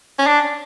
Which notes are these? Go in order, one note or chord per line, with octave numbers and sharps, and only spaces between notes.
C#4
D4